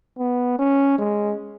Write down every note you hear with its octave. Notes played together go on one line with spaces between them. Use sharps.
B3
C#4
G#3